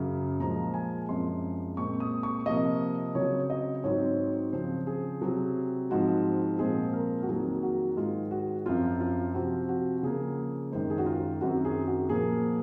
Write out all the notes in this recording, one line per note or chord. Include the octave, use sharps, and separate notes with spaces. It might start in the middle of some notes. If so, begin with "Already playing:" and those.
Already playing: F#2 C#3 F#3
A#2 F3 G#3 A#5
G#5
F#2 F3 G#3 C4 C6
A#2 G#3 C4 C#6
D#6
C#6
C3 F3 A#3 D#5
C#3 F#3 C4 C#5
D#5
G#2 F#3 C4 C#5
C#3 F3 C4 C5
G#4
C3 F#3 C4
G#2 F3 G#3 C4 F#4
A#2 F3 G#3 C4 G#4
A#4
F#4
F2 D#3 F#3 A#3 G#4
F#4
G#2 D#3 G#3 F4
F#4
F#2 F3 C4 F4
F4
C3 F3 C4 F#4
F#4
C#3 F3 A#3 G#4
F#2 D#3 G#3 C5
G#4
F#4
F4
F#2 D#3 F#3 C4 F#4
G#4
F#4
A#2 F3 A#3 G#4